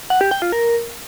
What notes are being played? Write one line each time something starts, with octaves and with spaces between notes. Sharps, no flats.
F#5
G4
G5
F4
A#4